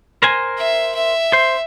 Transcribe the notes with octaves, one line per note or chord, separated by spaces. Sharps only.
A#4 C5 G#5
E5
E5
C5